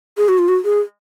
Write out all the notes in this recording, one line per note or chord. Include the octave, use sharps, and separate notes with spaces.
G#4
F#4
F4
F#4
G#4